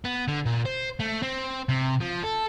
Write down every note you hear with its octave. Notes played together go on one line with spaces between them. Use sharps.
B3
D3
A#2
C5
A3
C4
C3
F3
A4